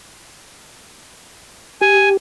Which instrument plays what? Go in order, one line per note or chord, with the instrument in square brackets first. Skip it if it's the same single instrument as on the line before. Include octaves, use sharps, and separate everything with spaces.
[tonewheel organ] G4 [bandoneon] G#5